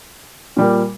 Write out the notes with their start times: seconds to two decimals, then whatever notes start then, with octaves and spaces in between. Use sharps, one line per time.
0.57 A#2 G3 A#3